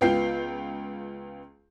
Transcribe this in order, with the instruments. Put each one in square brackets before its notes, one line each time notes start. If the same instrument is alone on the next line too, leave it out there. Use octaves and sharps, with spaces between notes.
[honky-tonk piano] C#2 B3 F4 G5 G6 C7